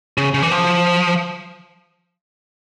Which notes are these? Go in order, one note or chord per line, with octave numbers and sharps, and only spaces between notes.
C#3
C#3
E3
F3